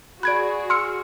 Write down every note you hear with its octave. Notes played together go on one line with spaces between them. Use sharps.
F#4 G#4 D5 B5 F#6 G#6 D7
C6 E6 F6 C#7